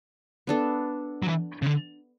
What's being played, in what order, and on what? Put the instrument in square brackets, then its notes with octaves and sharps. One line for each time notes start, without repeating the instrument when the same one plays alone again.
[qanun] B3 D4 A4
[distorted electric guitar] F#3
E3
C#3
D3